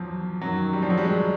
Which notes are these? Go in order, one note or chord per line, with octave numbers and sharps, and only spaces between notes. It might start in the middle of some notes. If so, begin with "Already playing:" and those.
Already playing: E2 F3 F#3
F#2 D#3 F#3
G3
F3
F#3
G3
G#3